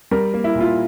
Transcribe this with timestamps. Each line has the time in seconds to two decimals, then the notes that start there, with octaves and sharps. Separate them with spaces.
0.11 G3 A#4
0.34 A#3
0.44 E4
0.55 A#2
0.60 F4